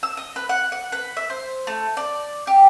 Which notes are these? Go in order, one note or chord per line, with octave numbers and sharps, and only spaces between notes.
E6
D#5
B4
F#5
F#5
B4
E5
C5
A3
D5
G4